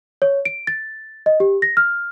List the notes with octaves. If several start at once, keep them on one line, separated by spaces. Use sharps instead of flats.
C#5
D7
A6
D#5
G4
A#6
F6